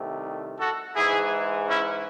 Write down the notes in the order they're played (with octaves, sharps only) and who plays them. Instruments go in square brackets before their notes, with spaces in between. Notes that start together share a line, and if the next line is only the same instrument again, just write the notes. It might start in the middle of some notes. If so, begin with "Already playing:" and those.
Already playing: [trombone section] C2 C3 D#3 A3
F#4 A4
G#2 E3 G#3 E4 G#4
C#4 E4